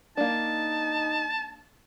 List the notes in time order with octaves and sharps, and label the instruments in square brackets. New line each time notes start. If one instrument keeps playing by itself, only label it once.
[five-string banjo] A#3 D4 [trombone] D#4 [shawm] A5